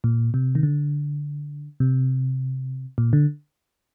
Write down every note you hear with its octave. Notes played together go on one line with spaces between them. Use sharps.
A#2
C3
D#3
D3
C3
A#2
D3